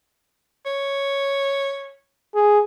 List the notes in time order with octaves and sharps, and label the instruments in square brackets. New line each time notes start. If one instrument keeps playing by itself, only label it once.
[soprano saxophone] C#5
[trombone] G#4